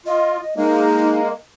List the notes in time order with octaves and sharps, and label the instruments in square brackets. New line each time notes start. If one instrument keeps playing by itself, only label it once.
[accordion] F4 [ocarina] D#5
[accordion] G#3 A#3 [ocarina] D#4